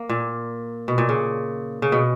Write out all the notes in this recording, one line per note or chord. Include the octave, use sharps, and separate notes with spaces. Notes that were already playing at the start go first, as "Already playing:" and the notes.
Already playing: A#3
A#2
B2
A#2
C#3
C#3
B2